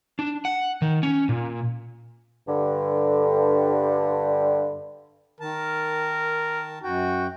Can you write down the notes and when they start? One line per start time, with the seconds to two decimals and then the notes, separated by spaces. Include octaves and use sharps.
0.19 D4
0.45 F#5
0.82 D#3
1.03 C#4
1.29 A#2
2.48 G2 D3
5.40 D#3 A#4 A5
6.83 F#2 F#4 G5